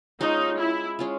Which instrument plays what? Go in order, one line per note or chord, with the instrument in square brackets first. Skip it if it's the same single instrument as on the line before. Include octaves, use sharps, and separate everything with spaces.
[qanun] G#3 C#4 F4 [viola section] D#4
[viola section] E4
[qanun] G#3 C#4 F4